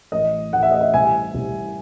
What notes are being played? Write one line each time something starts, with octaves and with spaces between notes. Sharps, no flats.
A1 D#5
A1 F#5
E5
D#5
E5
C2 E5 G#5
C2